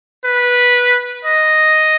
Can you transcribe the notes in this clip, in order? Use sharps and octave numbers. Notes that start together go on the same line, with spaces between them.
B4
D#5